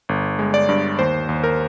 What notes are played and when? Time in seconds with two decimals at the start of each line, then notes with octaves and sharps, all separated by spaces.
0.09 G1
0.39 G#3
0.54 D5
0.69 G2
0.99 D#2 C5
1.29 D#2
1.43 A#4